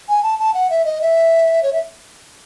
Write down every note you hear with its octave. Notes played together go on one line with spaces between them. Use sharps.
G#5
A5
A5
F#5
E5
D#5
E5
C#5
E5